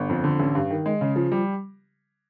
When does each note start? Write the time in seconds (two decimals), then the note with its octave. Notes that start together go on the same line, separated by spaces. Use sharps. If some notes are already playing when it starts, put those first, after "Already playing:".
Already playing: G1
0.09 F2
0.24 D3
0.40 A1
0.55 G2
0.70 D#3
0.86 G#3
1.01 C#3
1.16 F3
1.32 G3